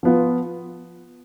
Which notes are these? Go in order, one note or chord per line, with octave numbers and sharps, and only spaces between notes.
F3 B3 F4